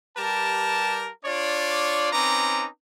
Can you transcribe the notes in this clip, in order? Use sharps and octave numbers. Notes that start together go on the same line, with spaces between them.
G3 G4 A#4 B4 A5
D4 F4 C#5 D5
C4 C#4 D#4 B4 A#5 D6